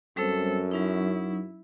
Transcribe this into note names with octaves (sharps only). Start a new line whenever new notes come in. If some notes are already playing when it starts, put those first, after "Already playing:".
F#2 G3 C4 A4 C5
F#3 C#4 D#4 E4